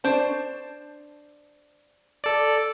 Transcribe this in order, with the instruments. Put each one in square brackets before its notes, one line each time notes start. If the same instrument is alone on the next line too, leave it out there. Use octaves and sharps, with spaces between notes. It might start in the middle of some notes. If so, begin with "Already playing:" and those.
[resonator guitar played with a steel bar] D4 C5 A5
[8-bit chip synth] A4 D5